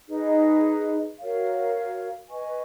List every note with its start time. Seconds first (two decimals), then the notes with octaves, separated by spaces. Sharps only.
0.08 D#4 G#4 B4 D#5
1.19 F#4 A#4 C#5 F5
2.29 B4 D#5 G#5 C#6